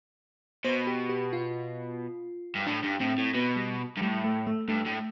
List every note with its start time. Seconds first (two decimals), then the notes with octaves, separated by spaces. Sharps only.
0.64 B2 C5
0.87 G4
1.09 G4
1.33 F4
2.55 G2
2.66 A2 D4
2.83 G2
3.00 A2 C4
3.18 A2
3.34 B2 B3
3.56 G3
3.97 G2
4.01 A2 G3
4.24 A3
4.47 A3
4.68 G2 A3
4.86 A2